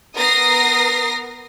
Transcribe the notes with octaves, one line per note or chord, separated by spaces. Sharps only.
B3 A#4 A#5 D#6 A#6 C7